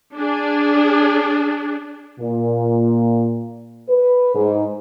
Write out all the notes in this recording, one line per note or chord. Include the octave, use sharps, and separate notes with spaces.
D4 G#4
A#2
B4
G#2